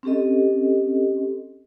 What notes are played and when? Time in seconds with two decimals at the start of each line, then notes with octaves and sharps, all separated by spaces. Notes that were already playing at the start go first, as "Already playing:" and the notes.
0.03 C4 C#4 G4 A4 D#5